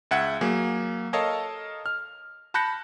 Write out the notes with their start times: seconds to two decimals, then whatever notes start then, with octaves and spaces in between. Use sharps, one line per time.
0.11 C#2 E5 F#5 G#6
0.41 F#3 A#3 G#4
1.13 A4 A#4 C#5 D#5 F5 A5
1.86 F6
2.54 A5 B5 F#6 G6 A#6 C#7